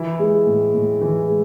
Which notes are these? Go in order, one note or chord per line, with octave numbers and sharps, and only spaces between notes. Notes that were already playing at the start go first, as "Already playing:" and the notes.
Already playing: E3 E4
G#3
A2
A2
E3
G#3